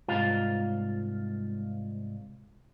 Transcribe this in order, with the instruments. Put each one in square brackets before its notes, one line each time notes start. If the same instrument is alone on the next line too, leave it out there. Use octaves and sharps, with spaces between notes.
[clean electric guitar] C2 G#2 F4 F5